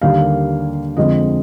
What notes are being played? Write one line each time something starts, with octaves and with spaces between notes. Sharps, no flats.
D#2 D3 G3 A#3 F5
F2 D3 G#3 C4 D#5